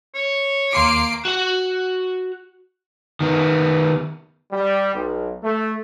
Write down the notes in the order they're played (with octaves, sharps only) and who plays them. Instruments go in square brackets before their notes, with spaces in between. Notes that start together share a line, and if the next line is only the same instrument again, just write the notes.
[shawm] C#5
[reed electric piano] D#2 C6 D6 [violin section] A#3 C7 D7
[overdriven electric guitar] F#4 F#5
D#3 B3
[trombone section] G3
B1
A3